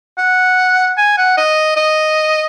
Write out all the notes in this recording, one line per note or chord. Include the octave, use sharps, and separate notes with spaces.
F#5
G#5
F#5
D#5
D#5